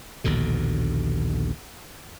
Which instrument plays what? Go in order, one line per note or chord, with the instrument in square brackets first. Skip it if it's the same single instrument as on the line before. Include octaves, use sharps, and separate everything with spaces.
[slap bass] A#1 D#2 B2 D3